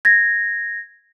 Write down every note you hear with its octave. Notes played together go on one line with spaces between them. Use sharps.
G#6 A#6